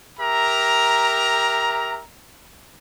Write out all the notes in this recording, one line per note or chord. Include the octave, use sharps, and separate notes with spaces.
G4 A#4 E5 A#5